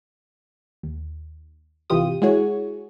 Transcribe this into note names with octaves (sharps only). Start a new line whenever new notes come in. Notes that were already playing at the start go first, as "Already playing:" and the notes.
D#2
G#1 C3 E3 F4 G4 D#6
G#3 E4 F#4 G#4 C#5